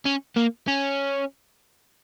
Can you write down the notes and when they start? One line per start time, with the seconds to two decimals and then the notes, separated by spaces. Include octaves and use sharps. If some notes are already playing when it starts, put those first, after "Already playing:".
0.06 C#4
0.37 A#3
0.68 C#4